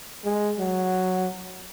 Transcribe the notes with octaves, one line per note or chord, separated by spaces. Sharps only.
G#3
F#3